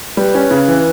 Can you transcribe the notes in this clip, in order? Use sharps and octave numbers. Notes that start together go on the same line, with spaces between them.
G3 B4
C#4
C#3
E3